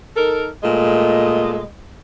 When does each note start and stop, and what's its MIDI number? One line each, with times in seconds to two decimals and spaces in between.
0.16 0.49 63
0.16 0.49 69
0.16 0.49 70
0.62 1.63 46
0.62 1.63 56
0.62 1.63 57
0.62 1.63 75